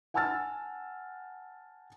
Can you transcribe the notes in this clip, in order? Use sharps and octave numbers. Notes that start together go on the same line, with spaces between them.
F#5 G#5 A5 E6 F6 A6